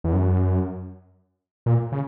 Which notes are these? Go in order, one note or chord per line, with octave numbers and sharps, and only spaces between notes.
E2
F#2
A#2
C#3